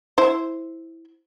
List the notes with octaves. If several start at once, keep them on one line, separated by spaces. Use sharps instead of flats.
E4 C5